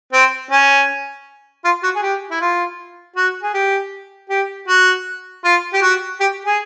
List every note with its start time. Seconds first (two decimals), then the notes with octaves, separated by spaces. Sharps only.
0.13 C4
0.51 C#4
1.65 F4
1.84 F#4
1.96 G#4
2.02 G4
2.31 E4
2.41 F4
3.16 F#4
3.43 G#4
3.54 G4
4.30 G4
4.68 F#4
5.44 F4
5.73 G4
5.82 F#4
6.20 G4
6.46 G#4